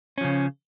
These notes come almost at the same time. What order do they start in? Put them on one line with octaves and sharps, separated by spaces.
C#4 F3 C#3